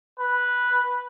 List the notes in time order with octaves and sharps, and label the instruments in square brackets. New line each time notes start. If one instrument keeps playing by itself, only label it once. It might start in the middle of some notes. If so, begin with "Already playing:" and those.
[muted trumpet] B4